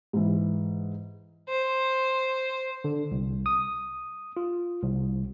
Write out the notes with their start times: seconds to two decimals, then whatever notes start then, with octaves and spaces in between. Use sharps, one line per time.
0.13 G#2 E3
1.48 C5
2.84 D3
3.11 C2
3.46 D#6
4.37 F4
4.83 C2